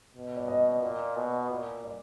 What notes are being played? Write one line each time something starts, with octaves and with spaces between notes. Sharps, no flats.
B2
D5
D#5
A#2
B2
A#2
D5